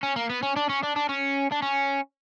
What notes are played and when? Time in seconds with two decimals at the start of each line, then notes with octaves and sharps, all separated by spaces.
0.03 C#4
0.16 A#3
0.30 B3
0.43 C#4
0.56 D4
0.69 C#4
0.83 D4
0.96 D4
1.09 C#4
1.52 D4
1.62 C#4